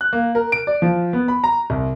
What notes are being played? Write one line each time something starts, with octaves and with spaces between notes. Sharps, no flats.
F#6
A#3
A#4
D7
D5
F3
B3
B5
A#5
C2